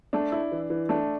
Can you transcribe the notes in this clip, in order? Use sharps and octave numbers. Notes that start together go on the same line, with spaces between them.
A3 D4
E4
E3
E3
A3 D4